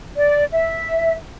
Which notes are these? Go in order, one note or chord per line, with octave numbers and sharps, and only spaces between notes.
D5
E5